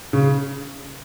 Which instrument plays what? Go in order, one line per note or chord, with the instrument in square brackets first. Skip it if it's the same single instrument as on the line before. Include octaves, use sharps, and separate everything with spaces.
[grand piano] C#3